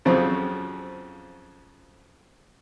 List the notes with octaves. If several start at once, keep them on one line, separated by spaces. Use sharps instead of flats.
F2 C#3 F3 F#3 C4